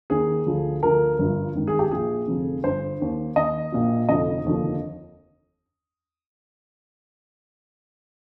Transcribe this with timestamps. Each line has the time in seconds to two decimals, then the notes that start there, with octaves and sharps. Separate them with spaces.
0.10 D#2 D#3 G#4
0.46 D2 D3 F3
0.83 D2 D3 F3 A#4
1.19 G1 G2 F3
1.55 G#1 G2 D#3
1.67 G#4
1.79 G4
1.91 A#1 A#2 F3 G#4
2.28 F1 F2 D3 F3
2.64 G1 G2 D3 C5
3.00 D#2 D#3
3.36 D#2 D#3 D#5
3.72 A#1 A#2 F3
4.09 F1 F2 D3 F3 D#5
4.45 F1 D#2 D3 F3